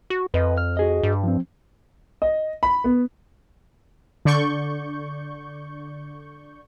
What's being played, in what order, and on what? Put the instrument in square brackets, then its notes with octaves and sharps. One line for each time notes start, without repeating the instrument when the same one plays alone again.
[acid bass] F#4
[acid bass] F2 [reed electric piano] B4 D#5
[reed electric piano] F6
F#4 G#4 D#5
[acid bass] G2
[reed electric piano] F3 C4
[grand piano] D#5
B5
B3
[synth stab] D3 D5 C#6 G6